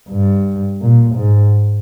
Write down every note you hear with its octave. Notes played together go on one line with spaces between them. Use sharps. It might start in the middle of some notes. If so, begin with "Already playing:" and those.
G2
A#2
G#2